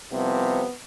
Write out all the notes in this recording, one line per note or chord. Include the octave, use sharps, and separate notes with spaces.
C2 C3 F3 B3